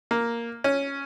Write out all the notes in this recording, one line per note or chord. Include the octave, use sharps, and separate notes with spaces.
A#3
C#4